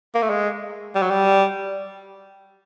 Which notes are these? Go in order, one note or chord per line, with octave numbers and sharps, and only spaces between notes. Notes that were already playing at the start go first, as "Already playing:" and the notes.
A#3
A3
G#3
G3
F#3
G3